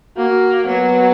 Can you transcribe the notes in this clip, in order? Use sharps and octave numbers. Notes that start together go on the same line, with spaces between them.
A#3 F#4
F#3 B3